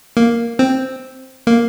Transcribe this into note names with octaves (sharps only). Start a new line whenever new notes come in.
A#3
C4
A#3